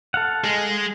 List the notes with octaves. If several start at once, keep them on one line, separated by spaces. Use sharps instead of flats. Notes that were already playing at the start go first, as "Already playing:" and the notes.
A4 F5 F#5
G#3